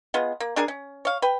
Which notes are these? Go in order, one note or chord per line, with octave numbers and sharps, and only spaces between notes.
G#3 B3 F4
A#3
D4 G#4 A#4 G#5
C#4
C#5 F5
B4 G5